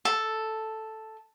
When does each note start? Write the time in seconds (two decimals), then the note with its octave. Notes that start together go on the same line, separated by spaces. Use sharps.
0.05 A4